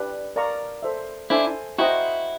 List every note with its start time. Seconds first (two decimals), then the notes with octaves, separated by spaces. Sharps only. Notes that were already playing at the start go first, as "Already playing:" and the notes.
Already playing: D4 G4 B4 D5
0.36 A#4 D5 F5 A#5 C#6
0.83 A4 C5 E5
1.30 D4 E4 A4 C5 E5 G#5
1.78 E4 F#4 C5 D#5 G5 A#5 C#6